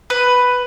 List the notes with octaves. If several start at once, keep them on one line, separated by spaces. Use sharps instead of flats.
B4